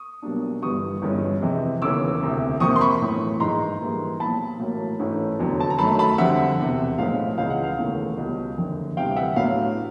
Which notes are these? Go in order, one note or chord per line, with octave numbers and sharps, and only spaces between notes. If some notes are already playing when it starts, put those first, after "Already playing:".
Already playing: C#6 D#6
B1 B2 G3 A#3 D4
G1 G2 E3 G3 B3 C#6 D#6
G1 G2 E3 G#3 C#4
F2 C3 E3 G#3
E1 D#2 C#3 E3 D6 E6
E1 D2 C3
F2 C3 F3 A#3 C#6 D#6
C6
B5 C#6
B1 A2 E3
A#1 G#2 E3 G#3 A#5 C6
G#2 E3 G3 A#3
B1 A#2 F3 A5 B5
A1 A2 F#3 A#3
A1 G#2 E3 A3 C#4
F1 F2 D3 F#3 B3
A5
A#5
F#2 D#3 F#3 A3 A5 B5
A5 B5
F2 D3 G3 C4 E5 F#5
E1 E2 C3
B1 A2 F3 G#3 B3 F5
C#2 C#3 E3 G#3 F5
F#5
F5
E1 D#2 C#3 E3 A3
C#2 B2 G3
F#1 F2 D3
D2 C3 E3 G3 F5 G5
E5 F#5
A2 F#3 B3 D4 F5